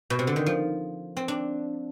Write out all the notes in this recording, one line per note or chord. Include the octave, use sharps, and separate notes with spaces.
B2
C3
D3
D#3
F3
C4
D4